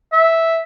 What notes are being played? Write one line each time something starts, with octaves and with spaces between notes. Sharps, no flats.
E5